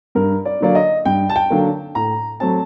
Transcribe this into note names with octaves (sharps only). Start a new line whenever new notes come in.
G2 A#4
D5
D3 F#3 A#3 D5
D#5
G2 G5
A5
G5
D3 F#3 A#3
A2 A#5
F#3 A3 C4 A5